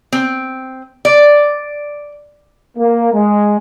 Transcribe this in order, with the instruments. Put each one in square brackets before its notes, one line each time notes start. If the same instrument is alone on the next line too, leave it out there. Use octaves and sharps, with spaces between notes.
[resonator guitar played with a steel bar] C4
D5
[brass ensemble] A#3
G#3